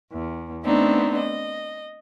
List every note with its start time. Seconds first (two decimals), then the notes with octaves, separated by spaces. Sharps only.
0.11 E2
0.64 A3 B3 C4 D4 D#4
1.17 D#5